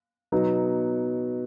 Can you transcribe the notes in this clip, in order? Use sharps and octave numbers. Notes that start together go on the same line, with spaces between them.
B2 F#3 B3 D#4